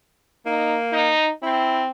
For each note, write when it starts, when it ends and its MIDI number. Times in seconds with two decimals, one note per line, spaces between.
0.46 1.12 58
0.46 0.75 63
0.92 1.30 63
1.42 1.90 60
1.42 1.82 64